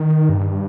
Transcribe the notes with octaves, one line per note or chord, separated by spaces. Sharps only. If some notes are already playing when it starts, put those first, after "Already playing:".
Already playing: D#3
G2